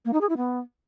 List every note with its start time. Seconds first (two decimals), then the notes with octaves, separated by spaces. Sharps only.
0.05 A#3
0.13 D#4
0.21 G#4
0.29 E4
0.37 B3